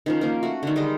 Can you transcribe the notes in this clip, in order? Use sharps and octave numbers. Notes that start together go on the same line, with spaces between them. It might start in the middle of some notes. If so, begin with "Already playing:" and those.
D#3 F3 C#4
F3 A#3
A3 F#4
D3 D#3
G3 G#3 G4 D#5